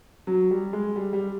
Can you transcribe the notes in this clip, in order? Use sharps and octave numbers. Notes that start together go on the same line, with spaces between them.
F#3
G3
G#3
G3
G3